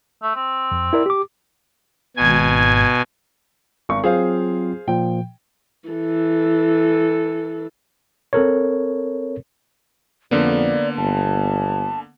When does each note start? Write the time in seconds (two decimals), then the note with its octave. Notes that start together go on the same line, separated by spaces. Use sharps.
0.23 A3
0.36 C4
0.71 F2
0.93 E4 A#4 D5
1.06 G4 D6
2.17 G#1 B2 G#5 G#6
3.89 G#1 C#6
4.04 F#3 C4 F4 G#4 C5 F5
4.88 A#2 F3 G5
5.89 E3 A4
8.33 C4 A4 A#4 C#5
10.31 F2 D3 A#3 B3 D5
10.97 G1 A5